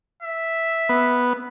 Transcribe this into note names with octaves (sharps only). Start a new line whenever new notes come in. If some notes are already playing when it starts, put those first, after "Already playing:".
E5
B3